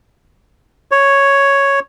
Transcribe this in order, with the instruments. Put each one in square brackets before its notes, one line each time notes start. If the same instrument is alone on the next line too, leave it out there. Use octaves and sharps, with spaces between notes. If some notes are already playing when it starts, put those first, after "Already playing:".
[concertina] C#5